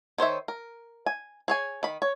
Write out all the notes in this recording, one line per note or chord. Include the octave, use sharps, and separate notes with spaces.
D#3 C5 C#5 E5
A#4
G#5
G#4 C#5 G#5
D#3 B5
C#5